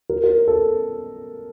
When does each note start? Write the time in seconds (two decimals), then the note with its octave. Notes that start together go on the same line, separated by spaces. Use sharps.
0.09 A#4
0.24 A#4
0.48 A4